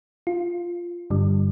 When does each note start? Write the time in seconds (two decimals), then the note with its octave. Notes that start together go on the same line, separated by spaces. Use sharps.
0.27 F4
1.10 G2 D3 G3